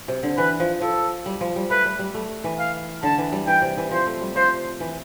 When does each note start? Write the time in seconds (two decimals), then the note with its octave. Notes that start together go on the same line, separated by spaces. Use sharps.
0.08 C3
0.23 D3
0.38 E3 B4
0.60 F3
0.81 F3 A4
1.26 G3
1.41 F3
1.56 G3
1.70 A3 B4
1.85 G3
1.99 G3
2.14 A3
2.44 E3
2.59 F5
3.03 D3 A5
3.18 E3
3.32 G3
3.47 E3 G5
3.62 C3
3.77 E3
3.91 F3 C5
4.06 A3
4.21 G3
4.36 F3 C5
4.80 E3